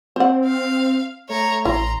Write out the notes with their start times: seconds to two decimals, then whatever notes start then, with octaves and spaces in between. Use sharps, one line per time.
0.16 C4 C5 F#5
0.46 F5
1.29 A3 C#5 A#5
1.65 A1 E4 A#5 C6